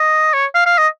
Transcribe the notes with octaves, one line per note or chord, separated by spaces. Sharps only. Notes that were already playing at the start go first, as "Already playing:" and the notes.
Already playing: D#5
C#5
F5
F5
D#5